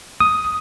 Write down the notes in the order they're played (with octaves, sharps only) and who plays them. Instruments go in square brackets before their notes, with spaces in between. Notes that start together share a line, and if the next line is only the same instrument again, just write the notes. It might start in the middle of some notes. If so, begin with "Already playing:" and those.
[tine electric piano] D#6